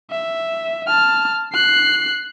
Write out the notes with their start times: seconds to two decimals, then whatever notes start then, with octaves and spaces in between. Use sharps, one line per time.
0.11 E5
0.87 A5 F6
1.53 F#6 C7